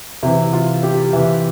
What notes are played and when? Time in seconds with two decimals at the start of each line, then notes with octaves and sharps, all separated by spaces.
0.23 C3 E3 E4
0.53 F4
0.83 G4
1.13 C3 E3 E5